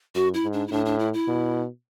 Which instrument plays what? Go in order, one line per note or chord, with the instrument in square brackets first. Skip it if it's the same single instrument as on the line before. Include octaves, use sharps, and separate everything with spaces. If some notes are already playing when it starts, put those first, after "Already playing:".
[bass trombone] F#2 [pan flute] F#4
[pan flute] E4
[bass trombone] G#2
[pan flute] D4
E4
[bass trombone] A2 [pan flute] D4
[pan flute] D4
E4
E4
[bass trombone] B2